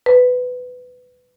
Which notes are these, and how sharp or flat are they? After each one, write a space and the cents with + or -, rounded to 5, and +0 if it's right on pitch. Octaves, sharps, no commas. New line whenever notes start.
B4 +15